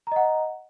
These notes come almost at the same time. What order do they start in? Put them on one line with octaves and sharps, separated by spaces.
A#5 D#5 F#5